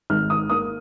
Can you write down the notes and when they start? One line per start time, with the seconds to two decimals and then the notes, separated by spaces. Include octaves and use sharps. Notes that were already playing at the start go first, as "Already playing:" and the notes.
0.10 G#1 F6
0.30 D#3 D#6
0.50 A#3 D#6